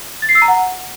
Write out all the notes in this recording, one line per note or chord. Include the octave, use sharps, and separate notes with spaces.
A6
C7
E6
A#5
F#5